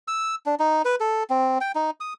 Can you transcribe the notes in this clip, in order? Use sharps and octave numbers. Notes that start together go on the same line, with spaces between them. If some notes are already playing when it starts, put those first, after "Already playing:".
E6
D4
D#4
B4
A4
C4
G5
D#4
D#6